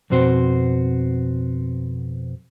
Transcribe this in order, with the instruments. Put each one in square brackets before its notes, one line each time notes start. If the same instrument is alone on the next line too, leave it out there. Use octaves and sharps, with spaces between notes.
[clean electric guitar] F2 B2 C4 F#4 C5